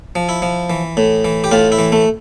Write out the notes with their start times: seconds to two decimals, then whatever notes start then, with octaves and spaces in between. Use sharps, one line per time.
0.15 F3
0.29 E4
0.42 F3
0.70 E3
0.97 A2
1.25 E3
1.44 G4
1.52 A2 F4
1.72 E4
1.78 E3
1.92 A3